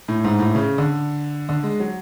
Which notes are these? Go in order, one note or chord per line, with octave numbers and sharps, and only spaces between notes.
A2
G#2
A2
C#3
D3
D3
G#3
F#3